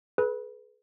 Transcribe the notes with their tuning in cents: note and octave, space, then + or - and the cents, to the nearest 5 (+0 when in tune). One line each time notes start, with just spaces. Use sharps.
G#4 +45 B4 +0 B5 -20